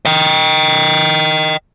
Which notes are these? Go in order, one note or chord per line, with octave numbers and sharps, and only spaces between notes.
D#5 G5